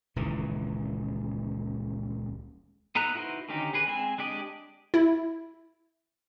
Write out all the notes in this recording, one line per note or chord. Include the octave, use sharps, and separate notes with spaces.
D#1 C#2 D#3 E3
B3 D#4 A4 A#5 F#6
D#4 E4 F#4 B4 C5
D3 D#3 C#4 D#4 G4
C#4 G#4 B4
G#3 C4 G#5
G#3 D4 G4 D5 D#5
E4